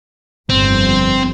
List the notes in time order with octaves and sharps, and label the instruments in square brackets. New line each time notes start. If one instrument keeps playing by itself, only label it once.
[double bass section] G1 F2 [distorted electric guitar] C4